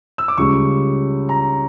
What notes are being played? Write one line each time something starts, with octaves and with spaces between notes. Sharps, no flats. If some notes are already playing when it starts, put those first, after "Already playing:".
E6
D6
C#2 C#3 G3 C#6
A#5